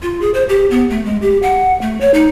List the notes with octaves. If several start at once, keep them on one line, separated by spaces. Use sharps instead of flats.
F4
G#4
C5
G4
B3
A3
G#3
G4
F#5
A3
C#5
D#4